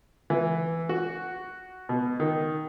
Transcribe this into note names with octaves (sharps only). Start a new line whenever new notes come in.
E3
F#4
B2
D#3